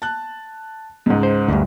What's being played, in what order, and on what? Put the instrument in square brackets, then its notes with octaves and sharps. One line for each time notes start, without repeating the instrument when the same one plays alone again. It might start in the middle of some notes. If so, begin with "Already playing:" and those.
[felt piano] A5 F#6
C#2 G#2
[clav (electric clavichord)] C5
D2 G2